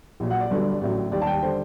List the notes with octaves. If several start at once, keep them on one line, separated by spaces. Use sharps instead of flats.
A#1 A#2 F#3
F#5
D5
G1 G2 D3 F#3
A1 A2 F#3
D#2 D#3 G3 D5
A5
G5
D3 G3 C5